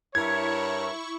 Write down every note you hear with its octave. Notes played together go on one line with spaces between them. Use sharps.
G2 E4 A#4 C#5 C#6 G#6